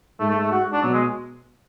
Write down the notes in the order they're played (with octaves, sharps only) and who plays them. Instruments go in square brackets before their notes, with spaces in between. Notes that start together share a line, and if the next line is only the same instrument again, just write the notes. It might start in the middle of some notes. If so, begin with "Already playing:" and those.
[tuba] G#2 [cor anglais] A3
[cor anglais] A3
A3
F#4
D4
[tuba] B2 [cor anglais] F#3
[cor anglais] G#3